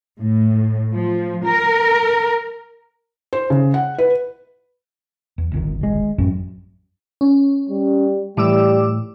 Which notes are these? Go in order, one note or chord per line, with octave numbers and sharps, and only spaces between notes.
A2
F3
A#4
C5
C#3
F#5
B4
E2
D1 G1 D#3
G#3
A1 F#2
C#4
G3
A2 E3 G3 D6 E6